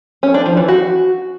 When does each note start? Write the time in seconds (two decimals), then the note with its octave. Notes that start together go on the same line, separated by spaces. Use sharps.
0.23 C#4
0.34 D4
0.46 F3
0.57 E3
0.68 F#4